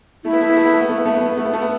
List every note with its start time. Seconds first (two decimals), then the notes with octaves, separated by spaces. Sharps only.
0.25 A3 E4
0.32 B3
0.41 A3
0.49 B3
0.56 A3
0.65 B3
0.73 A3
0.81 B3
0.89 A3
0.97 B3
1.05 A3
1.13 B3
1.21 A3
1.29 B3
1.37 A3
1.45 B3
1.53 A3
1.61 B3